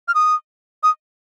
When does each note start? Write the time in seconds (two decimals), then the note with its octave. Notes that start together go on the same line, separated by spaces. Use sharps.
0.08 F6
0.15 D#6
0.83 D#6